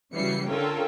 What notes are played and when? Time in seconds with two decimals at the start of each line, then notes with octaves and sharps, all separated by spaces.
0.14 C#3 E3 F#3 G3 C7 C#7
0.48 D3 C#4 F4 A4 A#4 G5